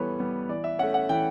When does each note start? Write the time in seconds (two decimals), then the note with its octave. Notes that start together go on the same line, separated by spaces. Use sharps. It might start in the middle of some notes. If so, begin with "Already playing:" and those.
Already playing: E3 G3 B3 A4 B4 C#5
0.19 G3 B3
0.49 E3 D5
0.64 E5
0.79 A3 C#4 F#5
0.94 F#5
1.09 E3 G5